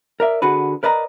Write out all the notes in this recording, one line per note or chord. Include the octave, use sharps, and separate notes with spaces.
A#4 D5 E5
D3 F#4 G#4 B4
A#4 B4 D5 D#5 A#5